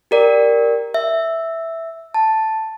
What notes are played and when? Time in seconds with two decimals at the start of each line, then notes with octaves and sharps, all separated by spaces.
0.11 G4 A#4 D5
0.94 E5
2.14 A5